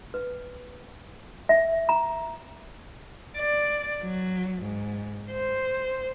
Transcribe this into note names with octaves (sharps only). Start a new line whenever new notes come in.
B4
E5
A#5
D5
F#3
G#2
C5